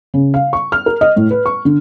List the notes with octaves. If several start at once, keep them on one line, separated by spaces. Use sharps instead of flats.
C#3
F5
C#6
F6
A#4
D#5
A2
B4
C#6
D3